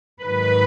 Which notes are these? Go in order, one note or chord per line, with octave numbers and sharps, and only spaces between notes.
G#2 D#3 F#3 B4